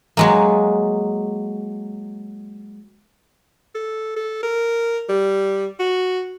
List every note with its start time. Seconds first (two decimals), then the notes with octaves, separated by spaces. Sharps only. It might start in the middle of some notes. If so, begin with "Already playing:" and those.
0.17 F#3 G#3 A#3
3.75 A4
4.16 A4
4.43 A#4
5.09 G3
5.80 F#4